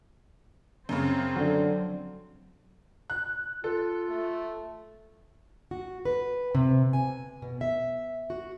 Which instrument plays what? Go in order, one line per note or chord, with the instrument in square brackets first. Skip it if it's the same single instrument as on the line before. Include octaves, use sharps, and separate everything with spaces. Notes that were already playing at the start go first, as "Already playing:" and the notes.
[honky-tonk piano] F#2 C#3 [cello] C4
[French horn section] D3 [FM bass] F#3
[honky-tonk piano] F#6
[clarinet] F4 [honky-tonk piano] A4
[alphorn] A3
[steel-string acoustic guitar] F#4
B4
C3
G#5
B2
E5
F#4